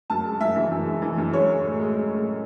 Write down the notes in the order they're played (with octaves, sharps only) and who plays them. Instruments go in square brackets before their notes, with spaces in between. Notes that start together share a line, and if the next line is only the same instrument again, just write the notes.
[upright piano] F#2 A5
G#3
F#2 E5
E3 E5
F#2
G#3
E3
F#2
G#3 C#5
G#3
A2
G#3
G#3
A2
A2